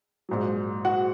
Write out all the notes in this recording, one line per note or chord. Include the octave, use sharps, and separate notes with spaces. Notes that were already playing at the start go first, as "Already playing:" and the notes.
A#1 G#2 F#3
F#4 F#5